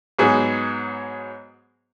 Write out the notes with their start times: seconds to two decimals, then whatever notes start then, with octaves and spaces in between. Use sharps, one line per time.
0.19 G#2 F#3 B3 G#4